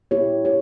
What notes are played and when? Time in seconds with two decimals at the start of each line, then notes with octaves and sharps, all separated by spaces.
0.11 A#3 E4 G4 C#5
0.45 G4 C#5